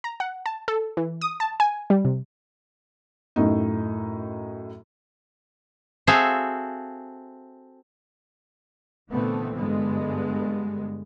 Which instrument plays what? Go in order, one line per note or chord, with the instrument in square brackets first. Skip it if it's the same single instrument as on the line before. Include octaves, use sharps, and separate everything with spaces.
[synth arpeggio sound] A#5
F#5
A5
A4
E3
D#6
A5
G#5
G3
C3
[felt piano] F#2 A2 D#4
[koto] C4 F#4 G#4 A4 E5 F5
[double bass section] A#2 D3 E3 A3 B3 C4
G2 D3 G#3 B3